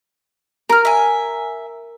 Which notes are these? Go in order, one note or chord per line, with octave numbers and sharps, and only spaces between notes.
A#4 A#5 F6
E5 G#5